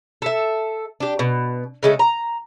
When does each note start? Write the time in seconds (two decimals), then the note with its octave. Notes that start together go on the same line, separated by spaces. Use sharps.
0.22 A4 E5
1.00 D4 G4
1.19 B2
1.83 C#3 G#3 A3
1.99 A#5